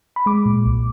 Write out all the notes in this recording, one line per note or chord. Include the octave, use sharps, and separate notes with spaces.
B5
G#3 D6
A#2
B1